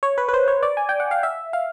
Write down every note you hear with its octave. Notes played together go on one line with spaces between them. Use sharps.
C#5
B4
B4
C5
C#5
D5
G#5
G5
F#5
F5
E5
F5